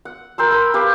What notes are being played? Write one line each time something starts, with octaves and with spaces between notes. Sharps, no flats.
F#5
A#4 G5 C6 E6
A#4 B5
G4 B4 F5